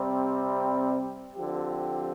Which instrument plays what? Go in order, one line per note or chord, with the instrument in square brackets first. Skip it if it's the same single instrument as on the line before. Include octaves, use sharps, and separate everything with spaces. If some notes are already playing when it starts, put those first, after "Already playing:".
Already playing: [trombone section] C3 G3 C4
D3 F3 C4 G4